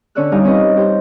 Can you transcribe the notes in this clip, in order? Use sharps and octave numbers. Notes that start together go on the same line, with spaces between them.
D3 C#4 C#5 D5 E6 F#6
G3 D#4 G4 F5 G#5 D#6
C4 C#4 D#4 F4 B4 D#5
G4 C5 G5